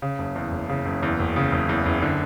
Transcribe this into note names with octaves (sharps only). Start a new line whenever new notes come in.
C#3
F#1
E2
F#1
C#3
F#1
E2
F#1
C#3
F#1
E2
F#1
D3